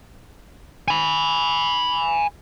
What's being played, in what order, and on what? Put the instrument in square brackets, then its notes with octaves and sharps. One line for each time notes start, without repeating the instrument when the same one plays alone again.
[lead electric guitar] G#5 B5